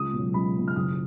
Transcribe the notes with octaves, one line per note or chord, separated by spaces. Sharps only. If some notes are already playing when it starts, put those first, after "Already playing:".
Already playing: C#2 D#6
B2 F#3
C#2 B5
B2 F#3
F6
F#1 D#6